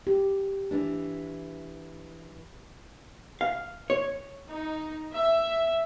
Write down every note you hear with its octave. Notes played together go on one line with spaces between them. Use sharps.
G4
E3 D4
F5
C#5
D#4
E5